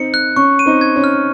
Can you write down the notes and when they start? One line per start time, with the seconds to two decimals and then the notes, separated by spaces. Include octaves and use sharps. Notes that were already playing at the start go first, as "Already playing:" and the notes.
Already playing: C4 D#4 C#7
0.14 F#6
0.36 C#4 C#6
0.59 D#7
0.66 C4 D#4
0.81 G#6
0.96 C#4
1.04 F6